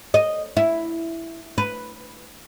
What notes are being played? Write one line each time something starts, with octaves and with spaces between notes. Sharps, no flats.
D#5
E4
B4